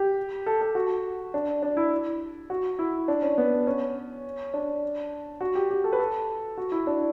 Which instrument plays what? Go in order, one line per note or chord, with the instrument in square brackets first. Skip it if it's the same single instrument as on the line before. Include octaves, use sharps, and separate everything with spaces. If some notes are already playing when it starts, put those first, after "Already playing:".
Already playing: [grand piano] G4
A4
A4
F#4
D4
D4
E4
F#4
E4
D4
C#4
B3
C#4
D4
F#4
G4
G4
A4
B4
A4
F#4
E4
D4